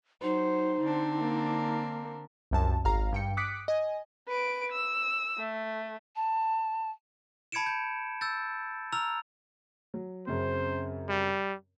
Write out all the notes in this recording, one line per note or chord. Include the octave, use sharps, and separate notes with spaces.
F#3 D#4 C5
D3 C4 D4
A#3
C2 F#2 A5
G#1 F5 A#5
G2 G5 C#7
D6 D#6 F#6 B6 C#7 D7
D#5 G#5
B4 D7
E6
A3
A5
A5 B5 G#6 C#7 D7 E7
G6
E6 G6 A6
A#5 E6 F6 F7
F#3
F#2 C#3 C4 C5
G3